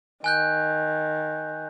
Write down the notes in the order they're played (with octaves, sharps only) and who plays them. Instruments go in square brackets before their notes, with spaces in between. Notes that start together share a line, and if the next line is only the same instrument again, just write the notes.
[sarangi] D#3 [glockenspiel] G#5 F#6 G6